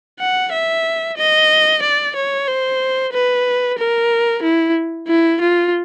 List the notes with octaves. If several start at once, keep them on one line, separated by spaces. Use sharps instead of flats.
F#5
E5
D#5
D5
C#5
C5
B4
A#4
E4
E4
F4